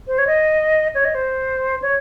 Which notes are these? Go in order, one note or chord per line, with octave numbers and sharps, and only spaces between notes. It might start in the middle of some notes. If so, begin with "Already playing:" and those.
C5
C#5
D#5
C#5
D#5
C5
C#5